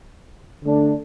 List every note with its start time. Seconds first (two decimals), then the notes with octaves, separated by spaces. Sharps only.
0.64 D3 A3 D4